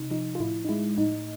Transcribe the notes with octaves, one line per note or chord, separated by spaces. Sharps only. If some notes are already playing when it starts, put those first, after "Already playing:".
Already playing: C3 D#4
F3 D#4
F4
A2 E4
D#4
G#3 E4
A2 D#4